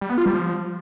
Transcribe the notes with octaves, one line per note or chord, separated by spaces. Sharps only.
G3
B3
F4
G3
F3